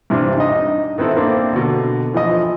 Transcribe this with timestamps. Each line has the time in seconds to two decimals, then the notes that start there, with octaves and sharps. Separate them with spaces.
0.10 G2 C3 E3 D4
0.37 D#4 D#5
0.98 D#3 B3 C4 E4 A4
1.17 A#3 C4 D4
1.53 B2 D3
2.14 E3 F3 D#5